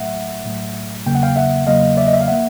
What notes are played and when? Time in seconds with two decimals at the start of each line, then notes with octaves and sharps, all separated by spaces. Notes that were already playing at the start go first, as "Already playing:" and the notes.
Already playing: A2 F#3 A3 E5 F#5
0.45 A2 F#3 A3
1.06 E2 C#3 F#3 A#3 G5
1.15 F#5
1.23 F5 G5
1.36 E5 F#5
1.67 E2 C#3 F#3 A#3 D#5 F5
1.97 D5 E5
2.07 D#5
2.13 E5
2.21 F5
2.27 F3 A#3 E5 F#5